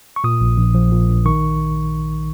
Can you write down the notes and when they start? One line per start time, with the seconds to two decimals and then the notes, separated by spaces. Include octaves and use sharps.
0.16 C#6
0.24 A#2 D#6
0.41 A#1
0.58 A#1
0.75 F3
0.92 A#2
1.09 A#1
1.25 D#3 C#6